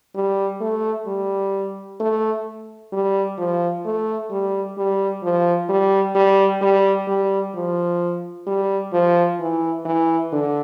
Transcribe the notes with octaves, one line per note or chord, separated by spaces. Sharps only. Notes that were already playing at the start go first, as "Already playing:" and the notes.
G3
A3
G3
A3
G3
F3
A3
G3
G3
F3
G3
G3
G3
G3
F3
G3
F3
E3
E3
D3